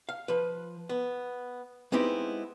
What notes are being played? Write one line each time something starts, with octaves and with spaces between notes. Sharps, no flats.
F5
F3 B4
B3
G#3 B3 C4 D#4 E4 G4